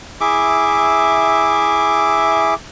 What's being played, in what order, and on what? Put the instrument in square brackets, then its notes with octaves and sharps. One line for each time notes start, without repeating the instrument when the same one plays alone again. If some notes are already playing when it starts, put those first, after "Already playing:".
[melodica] E4 G#4 E5 D6